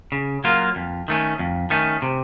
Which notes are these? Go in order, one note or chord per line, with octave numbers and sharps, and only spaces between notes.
C#3
F#3 A#3 F4
F2
D#3 A3 C#4
F2
D#3 A3 C#4
C3